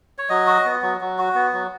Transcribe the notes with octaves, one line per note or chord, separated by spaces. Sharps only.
C#5
F#3 D#5
F#4
B3
F#3
F#3
F#4
B3
F#3